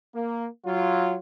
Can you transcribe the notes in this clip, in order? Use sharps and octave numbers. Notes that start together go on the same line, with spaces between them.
A#3
F#3 F4